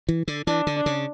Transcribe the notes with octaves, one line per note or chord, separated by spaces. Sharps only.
E3
D3
E3 D4
D3
D4
C#3